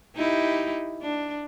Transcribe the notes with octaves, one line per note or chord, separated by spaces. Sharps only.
D#4 E4 G4
D4